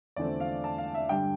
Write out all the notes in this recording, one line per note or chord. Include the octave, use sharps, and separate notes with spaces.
E2 D3 F3 A3 C4 D5
F5
A5
F5
E5
G2 D3 G3 G5